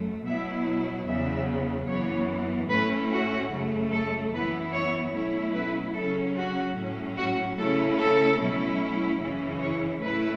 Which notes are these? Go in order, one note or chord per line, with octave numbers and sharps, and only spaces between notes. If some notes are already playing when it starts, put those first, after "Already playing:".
Already playing: F#2 A3
B2 F#3 B3 E4 E5
E2 C#3 F#3 B3 E5
F#2 E3 B3 C#5
A2 A3 C#4 E4 B4
F#4
F#2 C#3 A3
A4
F#2 E3 B3 E4 B4
C#5
B2 F#3 A3 C#4 E4 C#5
B4
C#3 F#3 C#4 A4
F#4
A2 F#3 C#4
F#4
C#3 A3 C#4 E4 A4
A4
B2 F#3 A3 C#4 E4
F#2 C#3 E3 C#4 E4
C#5
A2 A3 C#4 E4 B4